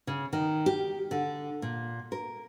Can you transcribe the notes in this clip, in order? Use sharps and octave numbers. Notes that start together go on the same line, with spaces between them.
C#3
D#3
G4
D3
A#2
A#4